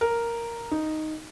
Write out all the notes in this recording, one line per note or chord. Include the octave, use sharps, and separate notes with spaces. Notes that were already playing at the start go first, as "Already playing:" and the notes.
A#4
D#4